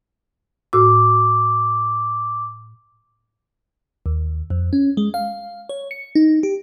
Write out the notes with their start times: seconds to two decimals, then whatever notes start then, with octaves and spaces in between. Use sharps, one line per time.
0.73 A2 F#4 D6 E6
4.06 D#2
4.50 F2
4.73 C#4
4.97 G#3
5.14 F5
5.69 C#5
5.91 C#7
6.15 D#4
6.43 G4